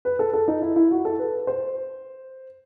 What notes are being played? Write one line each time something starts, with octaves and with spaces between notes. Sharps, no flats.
B4
A4
A4
D#4
E4
E4
F#4
A4
B4
C5